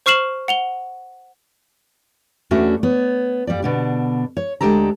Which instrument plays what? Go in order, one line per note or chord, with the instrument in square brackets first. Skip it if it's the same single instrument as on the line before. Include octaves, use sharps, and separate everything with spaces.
[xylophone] C5 C#6 F6 C7 E7 F#7
F#5 F7 G7
[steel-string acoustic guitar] E2 A3 C#4 D4 F#4 E5
B3 C#5
F2 G3 G4 D5
B2 D3 D4
C#5
D2 G#3 D4 G4 A4 A#5